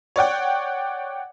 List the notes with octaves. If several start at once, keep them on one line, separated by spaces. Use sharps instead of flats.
C#5 D5 F#5 G5